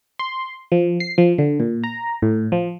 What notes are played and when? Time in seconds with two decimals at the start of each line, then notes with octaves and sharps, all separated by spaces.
0.19 C6
0.72 F3
1.00 C7
1.18 F3
1.38 D3
1.60 A#2
1.84 A#5
2.22 A2
2.52 F3